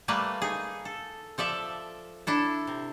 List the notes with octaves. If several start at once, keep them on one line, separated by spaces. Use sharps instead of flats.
G3 A3 A#3 B4 D5
D#4 G#4
A4
F3 A4 D5 E5
D4 E4 A4
C3